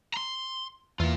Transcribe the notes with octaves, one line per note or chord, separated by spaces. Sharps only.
A#5 C6
E2 A#3 F4